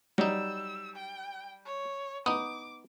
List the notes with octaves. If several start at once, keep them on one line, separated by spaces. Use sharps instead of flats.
F#3 G3 D#4 E6
G5
C#5
B3 D#4 D6 D#6